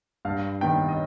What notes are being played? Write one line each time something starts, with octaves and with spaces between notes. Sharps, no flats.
G2 F5
D#3 B3 G5
D#5